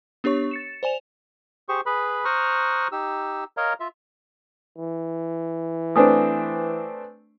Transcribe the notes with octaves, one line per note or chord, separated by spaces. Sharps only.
B3 D4 G4 C#5 C#6
A6 C#7 E7
C5 D5 G#5 E7 F7
G4 G#4 C5 C#6
G#4 B4 B5
C5 A#5 C#6 D#6 F6 F#6
D#4 G4 E6
A#4 C#5 D#5 F5 A#5
F4 E5
E3
A3 C4 D4 B4 G#5 D#6